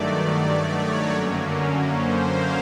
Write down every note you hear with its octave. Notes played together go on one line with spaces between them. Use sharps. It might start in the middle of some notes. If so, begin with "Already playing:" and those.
Already playing: G2 D#3 F#3 A3 D5
C#5
F#2 D3 F#3 A#3 C#4
C5
F5